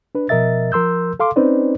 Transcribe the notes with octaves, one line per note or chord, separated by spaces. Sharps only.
D4 B4
B2 F3 A#4 D#5 E5 A6
F3 A#4 C6 E6 G6
A4 F5 C6 D6
C4 C#4 D#4 B4 C5 D5